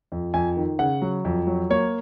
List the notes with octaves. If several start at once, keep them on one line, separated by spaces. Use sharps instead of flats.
F2
F2 G#5
D#3
C#3 F#5
F#3
F2
F#3
A#3 C#5